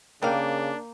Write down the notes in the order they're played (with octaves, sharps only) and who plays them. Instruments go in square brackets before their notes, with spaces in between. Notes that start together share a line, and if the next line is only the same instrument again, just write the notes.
[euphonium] C#3 [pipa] G3 F5 [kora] A#3 G5 [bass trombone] D4